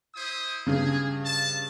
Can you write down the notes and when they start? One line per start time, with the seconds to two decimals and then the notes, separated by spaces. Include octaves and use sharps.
0.14 E4 C5 D#6
0.67 G2 C#3 G#4
1.24 A5